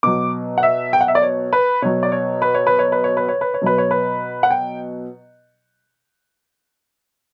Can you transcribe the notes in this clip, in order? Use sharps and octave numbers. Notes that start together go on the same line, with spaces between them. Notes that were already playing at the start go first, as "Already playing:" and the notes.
B2 F#3 D6
F#5
E5
G5
F#5
E5
D5
C#5
B4
B2 F#3 C#5
D5
C#5
B4
C#5
B4
C#5
B4
C#5
B4
C#5
B4
C#5
B2 F#3 B4
C#5
B4
F#5
G5